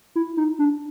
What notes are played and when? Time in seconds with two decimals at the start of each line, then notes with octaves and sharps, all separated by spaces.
0.16 E4
0.37 D#4
0.59 D4